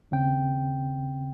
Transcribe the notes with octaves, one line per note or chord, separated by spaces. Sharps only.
D#2 C#3 C4 G5